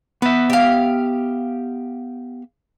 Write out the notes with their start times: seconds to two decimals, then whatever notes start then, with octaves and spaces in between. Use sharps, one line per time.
0.22 B3 B4 E5
0.50 G4 F5